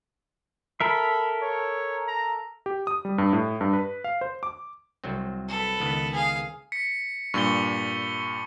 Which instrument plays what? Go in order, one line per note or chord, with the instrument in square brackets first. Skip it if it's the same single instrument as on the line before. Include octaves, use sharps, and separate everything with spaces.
[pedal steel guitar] A4 A#4 E5 [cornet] B5
[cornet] C#5
A#5
[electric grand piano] G4
D#6
G3
G2
A2
G2
B4
F5
C5
D6
[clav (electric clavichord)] C2 F#3 C4
[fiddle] A4 B4
[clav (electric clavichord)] C#2 D#3 B3
[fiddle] G#4 F5
[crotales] B6 C#7
[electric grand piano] G2 A#2 [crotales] C#6 C#7 G7